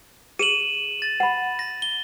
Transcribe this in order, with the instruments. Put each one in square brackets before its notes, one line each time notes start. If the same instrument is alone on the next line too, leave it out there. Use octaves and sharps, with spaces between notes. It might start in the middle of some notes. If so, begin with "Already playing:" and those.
[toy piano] G#4 [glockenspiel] D#7 E7 F#7
[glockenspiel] A6
[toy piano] F#5 B5
[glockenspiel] A#6
G7